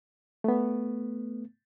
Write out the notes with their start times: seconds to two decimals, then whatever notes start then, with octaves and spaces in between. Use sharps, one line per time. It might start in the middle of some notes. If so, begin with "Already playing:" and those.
0.44 A3 B3